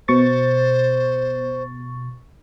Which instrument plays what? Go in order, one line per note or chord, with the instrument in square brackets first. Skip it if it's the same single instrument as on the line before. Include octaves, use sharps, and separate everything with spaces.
[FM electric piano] B2 C#6 A6 [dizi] C5